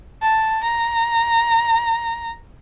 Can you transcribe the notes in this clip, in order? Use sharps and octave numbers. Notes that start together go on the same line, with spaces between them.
A5
A#5